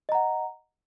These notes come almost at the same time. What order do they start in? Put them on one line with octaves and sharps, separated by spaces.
D#5 A#5 F#5